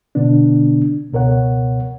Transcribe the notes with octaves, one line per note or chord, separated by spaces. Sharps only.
B2 D3 B3 D4
C#2 B2 A#4 C#5 F#5